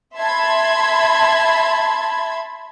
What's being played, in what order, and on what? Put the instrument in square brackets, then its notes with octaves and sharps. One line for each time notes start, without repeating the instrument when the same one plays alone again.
[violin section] E5 A5 B5 C6 G#6